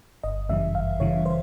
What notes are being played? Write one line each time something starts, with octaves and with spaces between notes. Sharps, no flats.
G1 D#5
F#2 C#3 E3 G3 E5
G1 F5
F#2 C#3 E3 G3 C#5
C5